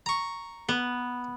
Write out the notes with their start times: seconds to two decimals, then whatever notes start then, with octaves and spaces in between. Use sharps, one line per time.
0.06 A#5 C#6
0.69 B3